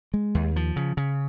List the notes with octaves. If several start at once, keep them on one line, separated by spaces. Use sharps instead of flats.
G#3
D#2
F3
C#3
C#3